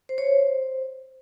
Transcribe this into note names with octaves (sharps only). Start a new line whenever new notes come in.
C5
C#5
C5